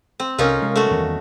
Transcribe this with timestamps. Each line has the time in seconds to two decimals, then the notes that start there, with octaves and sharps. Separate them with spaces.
0.20 C4
0.39 C2 C#4 D#4 F4 A4 A#4 F5
0.62 C3 G#3
0.76 A3 F#4
0.91 E2 D#3 G3